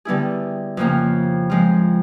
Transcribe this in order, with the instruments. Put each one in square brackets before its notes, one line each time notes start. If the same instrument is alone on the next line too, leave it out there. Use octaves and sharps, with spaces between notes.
[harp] D3 G3 B3 E4 G#4
F2 C#3 F3 A#3
F3 G#3 C4 F4